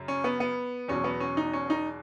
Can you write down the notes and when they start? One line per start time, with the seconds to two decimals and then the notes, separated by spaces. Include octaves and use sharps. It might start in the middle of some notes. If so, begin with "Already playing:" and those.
Already playing: F#2 C#3
0.08 C#4
0.24 B3
0.40 B3
0.88 E2 B2 F#3 C#4
1.04 B3
1.20 C#4
1.37 D#4
1.53 C#4
1.70 D#4